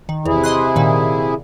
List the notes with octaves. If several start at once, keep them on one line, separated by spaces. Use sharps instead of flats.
D#3
E2 C3 E4 G#4
D#5 C6 F#6
A#2 D#3